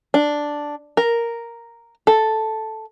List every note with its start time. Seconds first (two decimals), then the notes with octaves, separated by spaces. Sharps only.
0.14 D4
0.97 A#4
2.07 A4